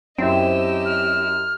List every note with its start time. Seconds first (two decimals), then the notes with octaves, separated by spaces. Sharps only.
0.18 F#2 C4 E4 G4 D#5 E5 E6
0.85 F6